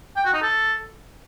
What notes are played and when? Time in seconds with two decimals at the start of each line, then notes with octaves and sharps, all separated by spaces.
0.16 G5
0.25 F#4
0.34 D#4
0.42 A4